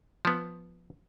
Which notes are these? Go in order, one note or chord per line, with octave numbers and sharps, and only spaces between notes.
F3 B3